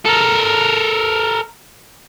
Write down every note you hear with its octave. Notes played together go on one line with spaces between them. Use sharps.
A4 A#4